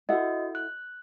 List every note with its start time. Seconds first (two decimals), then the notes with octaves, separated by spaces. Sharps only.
0.09 E4 F#4 A4 D#5 F#5
0.55 F#6